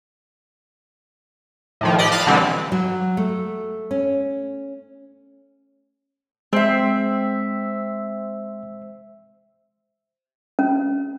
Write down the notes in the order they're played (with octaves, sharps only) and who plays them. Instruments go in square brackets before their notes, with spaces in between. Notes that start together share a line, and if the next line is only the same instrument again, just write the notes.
[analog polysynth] A2 D#3 F3
G4 D5 D#5
F5 A5 B5 D#6 F6 F#6
B2 D3 E3 G3 C4
[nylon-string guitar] F#3
A3
C#4
[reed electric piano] G#3 [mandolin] C4 E5
[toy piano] C#4